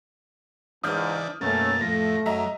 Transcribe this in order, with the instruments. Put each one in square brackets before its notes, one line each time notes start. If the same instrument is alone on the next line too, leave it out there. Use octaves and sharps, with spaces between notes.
[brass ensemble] C#2 G#2 [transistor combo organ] E3 D4 [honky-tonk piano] D#6 F6 G6
[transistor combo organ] F#2 B2 A#3 [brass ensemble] A3 C#4 [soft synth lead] A6
[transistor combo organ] F2 A2 F3 [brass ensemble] A3 [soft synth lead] A#6
[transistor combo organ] F#2 F#3 [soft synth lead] D#5 [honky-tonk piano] E5 A#5